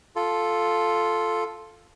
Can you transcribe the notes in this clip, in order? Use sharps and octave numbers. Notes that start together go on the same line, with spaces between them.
F4 A4